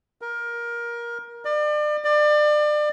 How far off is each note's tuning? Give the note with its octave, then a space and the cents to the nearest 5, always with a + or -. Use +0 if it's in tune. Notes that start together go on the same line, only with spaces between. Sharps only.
A#4 +20
D5 +35
D5 +30